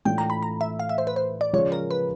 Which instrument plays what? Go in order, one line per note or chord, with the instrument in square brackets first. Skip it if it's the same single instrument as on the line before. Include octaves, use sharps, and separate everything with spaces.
[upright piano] A2 E3 A3 D4 F4 [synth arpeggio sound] G5
[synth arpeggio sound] A#5
B5
A#5
E5
F5
E5
C5
B4
C5
D5
[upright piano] C#3 F3 G#3 C#4 F4 [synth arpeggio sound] C#5
[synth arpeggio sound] A#4
B4